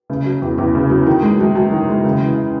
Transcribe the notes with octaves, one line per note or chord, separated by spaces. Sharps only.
C#3
F#3
E2
E2
C#3
F#3
D#3
G#3
F#2
F#2
D#3
G#3
C#3
E3